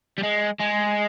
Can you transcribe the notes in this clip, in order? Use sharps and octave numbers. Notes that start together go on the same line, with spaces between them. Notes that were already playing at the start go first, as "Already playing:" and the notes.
G3
G#3
G#3